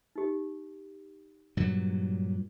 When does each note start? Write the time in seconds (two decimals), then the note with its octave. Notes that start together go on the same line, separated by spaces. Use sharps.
0.16 D#4 G4
1.57 G2 A#2 F#3